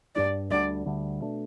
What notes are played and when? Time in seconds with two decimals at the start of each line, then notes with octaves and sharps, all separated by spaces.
0.15 G2 G3 D4 D5
0.50 D2 D3 G3 D4 D5
0.86 D2 D3 G3 D4
1.21 B2 A3 D4